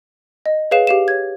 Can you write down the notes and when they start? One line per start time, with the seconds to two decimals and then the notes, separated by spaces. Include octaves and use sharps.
0.46 D#5
0.71 G#4 B4 C#5 F5 E7
0.87 G4 F5 E7
1.08 C#5 G#6